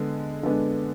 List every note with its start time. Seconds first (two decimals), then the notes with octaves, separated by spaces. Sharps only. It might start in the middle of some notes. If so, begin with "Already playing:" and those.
Already playing: D3 G#3 B3
0.43 D3 G#3 B3 D4